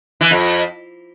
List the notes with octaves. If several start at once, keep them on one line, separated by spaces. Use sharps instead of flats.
E3
F2